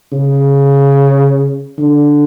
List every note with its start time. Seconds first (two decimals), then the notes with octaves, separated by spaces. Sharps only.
0.12 C#3
1.78 D3